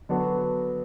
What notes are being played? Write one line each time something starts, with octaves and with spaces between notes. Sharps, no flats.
D3 F#3 B3 D4 F#4